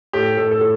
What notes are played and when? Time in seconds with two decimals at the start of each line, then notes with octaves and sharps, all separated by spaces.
0.13 A2 G4
0.37 A2 A4
0.51 A4
0.61 A2